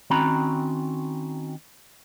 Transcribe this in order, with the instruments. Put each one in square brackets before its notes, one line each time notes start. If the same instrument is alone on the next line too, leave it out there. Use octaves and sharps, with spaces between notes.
[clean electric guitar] D#3 C4 C#4 F#4 A#5 B5